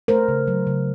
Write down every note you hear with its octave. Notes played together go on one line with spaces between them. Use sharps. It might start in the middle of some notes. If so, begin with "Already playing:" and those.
A3 A#4 C5
C#3
F#3
C#3